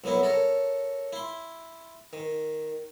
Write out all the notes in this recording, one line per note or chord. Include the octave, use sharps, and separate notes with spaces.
C2 F#3 B3 E4 F#4
A4 A#4 C#5
E4 C6
D#3